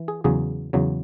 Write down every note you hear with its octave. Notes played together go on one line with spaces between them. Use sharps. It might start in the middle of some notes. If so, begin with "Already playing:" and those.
Already playing: E3
G#4
E2 C#3 F#3 G#4
E2 C#3 F#3